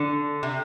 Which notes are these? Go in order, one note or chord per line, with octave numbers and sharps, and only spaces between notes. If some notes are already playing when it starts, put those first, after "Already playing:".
Already playing: D3
C3